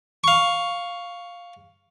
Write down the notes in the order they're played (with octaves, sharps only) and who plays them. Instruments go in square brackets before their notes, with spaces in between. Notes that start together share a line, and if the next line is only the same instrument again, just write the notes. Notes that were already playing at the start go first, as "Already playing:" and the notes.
[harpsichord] F5 C#6